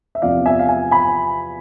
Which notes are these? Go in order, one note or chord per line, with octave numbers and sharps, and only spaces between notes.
E5
E2 C3 F3 D5 F5
E5 G#5
F5
E5 G#5
G#5 B5